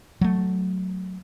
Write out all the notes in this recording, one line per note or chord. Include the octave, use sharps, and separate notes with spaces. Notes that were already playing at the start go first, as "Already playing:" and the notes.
F#3 A3